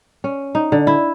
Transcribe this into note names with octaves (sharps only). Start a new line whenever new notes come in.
C#4
D#4
D3
E4